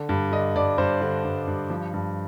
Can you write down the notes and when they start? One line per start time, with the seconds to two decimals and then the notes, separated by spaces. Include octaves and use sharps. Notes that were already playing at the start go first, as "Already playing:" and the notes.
Already playing: D3
0.09 G2
0.32 D3 D#5
0.56 G2 D5
0.78 G2 C5
1.01 D3
1.25 G2
1.48 G2
1.70 F3
1.94 G2